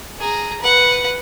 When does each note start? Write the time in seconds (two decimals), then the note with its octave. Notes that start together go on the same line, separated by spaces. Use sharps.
0.19 G#4 A#5
0.60 B4 F#5